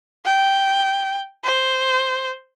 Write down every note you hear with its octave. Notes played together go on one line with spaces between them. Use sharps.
G5
C5